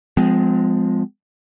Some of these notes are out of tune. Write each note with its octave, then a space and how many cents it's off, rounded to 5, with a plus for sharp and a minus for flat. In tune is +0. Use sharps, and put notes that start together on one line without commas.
F3 +15 G#3 +0 C4 -40